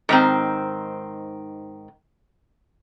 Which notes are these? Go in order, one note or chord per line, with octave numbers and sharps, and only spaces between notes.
G#2 D#3 C4